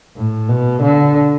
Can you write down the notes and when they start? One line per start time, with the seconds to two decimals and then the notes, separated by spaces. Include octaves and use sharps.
0.16 A2
0.49 B2
0.82 D3